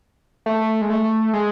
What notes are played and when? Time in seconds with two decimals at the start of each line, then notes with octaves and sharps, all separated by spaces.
0.46 A3
0.81 G#3
0.90 A3
1.33 G#3